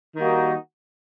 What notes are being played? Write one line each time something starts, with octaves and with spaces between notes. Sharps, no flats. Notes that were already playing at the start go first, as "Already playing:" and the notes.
D#3 G3 A#3 D#4 F#4